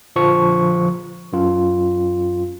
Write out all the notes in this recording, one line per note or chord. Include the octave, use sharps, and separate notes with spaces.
A#1 D3 F3 C#6
F#2 F4